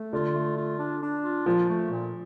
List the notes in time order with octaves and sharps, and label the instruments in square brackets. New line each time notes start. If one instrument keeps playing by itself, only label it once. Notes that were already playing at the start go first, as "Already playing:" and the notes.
Already playing: [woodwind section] A3
[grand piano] D3 [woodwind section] F4
[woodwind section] A3
F4
D4
D4
F4
[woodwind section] A#2 [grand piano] F3
[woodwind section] A3
A#2